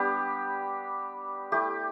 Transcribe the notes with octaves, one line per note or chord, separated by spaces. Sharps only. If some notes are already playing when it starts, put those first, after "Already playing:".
Already playing: G3 B3 D4 G4
A3 E4 G4